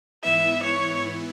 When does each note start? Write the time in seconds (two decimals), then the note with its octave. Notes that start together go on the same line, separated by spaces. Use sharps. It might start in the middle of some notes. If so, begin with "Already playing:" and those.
0.23 G#2 E3 B3 E4 E5
0.63 C#5